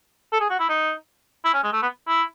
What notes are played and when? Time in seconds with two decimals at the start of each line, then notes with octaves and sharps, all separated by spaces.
0.32 A4
0.41 G#4
0.50 F#4
0.59 E4
0.69 D#4
1.44 E4
1.53 C#4
1.63 G#3
1.73 A3
1.82 B3
2.07 E4